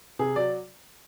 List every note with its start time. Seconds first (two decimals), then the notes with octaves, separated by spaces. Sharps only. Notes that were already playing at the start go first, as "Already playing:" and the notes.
0.19 C3 G#4
0.36 F#3 D5